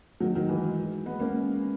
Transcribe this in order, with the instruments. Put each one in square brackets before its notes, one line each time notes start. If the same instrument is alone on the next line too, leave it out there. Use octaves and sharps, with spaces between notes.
[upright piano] D#3 F#3
D#3 F#3
E3 G#3
G#3 B3
A#3 C#4